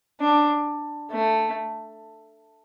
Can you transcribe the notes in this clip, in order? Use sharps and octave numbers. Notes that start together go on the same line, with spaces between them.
D4
A3